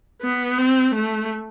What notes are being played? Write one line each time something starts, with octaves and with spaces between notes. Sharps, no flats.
B3
C4
A3